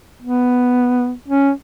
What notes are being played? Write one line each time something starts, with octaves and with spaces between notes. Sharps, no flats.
B3
C#4